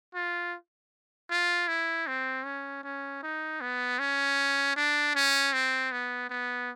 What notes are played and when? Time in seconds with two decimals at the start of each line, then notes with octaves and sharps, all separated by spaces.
0.15 F4
1.31 F4
1.68 E4
2.07 C4
2.45 C#4
2.84 C#4
3.23 D#4
3.61 B3
3.99 C#4
4.76 D4
5.15 C#4
5.53 C4
5.92 B3
6.30 B3